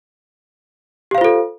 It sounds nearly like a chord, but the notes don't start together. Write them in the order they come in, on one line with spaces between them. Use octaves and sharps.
G4 F5 C5 F4 A4